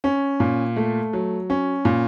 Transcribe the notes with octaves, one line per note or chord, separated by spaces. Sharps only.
C#4
A#2
A3
F#3
C#4
A#2